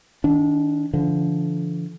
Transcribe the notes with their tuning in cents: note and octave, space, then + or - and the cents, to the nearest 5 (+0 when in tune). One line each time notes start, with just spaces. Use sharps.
D#3 +15 D4 -25
D3 -25 F3 -40